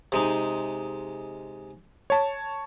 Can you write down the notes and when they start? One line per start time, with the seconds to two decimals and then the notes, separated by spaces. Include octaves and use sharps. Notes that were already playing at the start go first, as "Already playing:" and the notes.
0.12 C3 G#3 D#4
2.10 C#5 A5